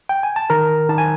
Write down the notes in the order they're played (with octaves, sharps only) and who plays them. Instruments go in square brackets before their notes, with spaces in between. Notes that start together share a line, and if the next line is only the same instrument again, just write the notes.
[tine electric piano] G5
G#5
A5
D#3 A#4 A#5
D#3 A5
G#5